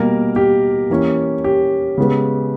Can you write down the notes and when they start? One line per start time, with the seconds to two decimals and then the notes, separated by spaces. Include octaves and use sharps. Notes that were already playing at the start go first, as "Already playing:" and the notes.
Already playing: B2 G3 A#3 A#4
0.36 G4
0.90 E3 A#3 C#4
1.44 G4
1.98 C#3 G#3 B3